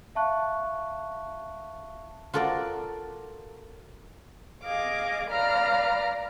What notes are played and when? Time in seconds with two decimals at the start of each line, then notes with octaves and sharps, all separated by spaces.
0.15 E5 F5 A5 C#6 F#6
2.33 F4 F#4 A4 A#4 D5
4.64 G#4 D#5 F5 D6
5.28 B4 D5 F5 A#5 F6